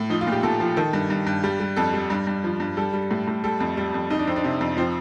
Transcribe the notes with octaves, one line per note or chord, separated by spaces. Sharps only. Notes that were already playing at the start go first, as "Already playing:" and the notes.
Already playing: A2
F3 D#4
F4
A#2
G4
A#2 A4
F3
D#3 A4
G2
G2
G2
G3
G3
F2 A4
G3
G2
G2
F3
G2
G3 A4
G3
A2
A2
G3 A4
F2
G3
F2
F2 D#4
D4
F2 C4
D4
C3
F2
F3 C4